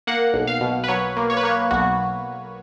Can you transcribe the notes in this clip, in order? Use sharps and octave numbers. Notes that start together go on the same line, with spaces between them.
A#3 F#5
B1
F5
B2
B4
F#3 C#5
A#3
C#5
B4
A#3 C#5
B1 F#4